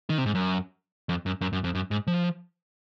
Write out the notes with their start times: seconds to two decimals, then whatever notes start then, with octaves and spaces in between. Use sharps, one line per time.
0.10 D#3
0.18 C3
0.26 G#2
0.35 F#2
1.09 F2
1.26 F#2
1.41 F#2
1.53 F#2
1.64 F2
1.75 F#2
1.91 G#2
2.07 F3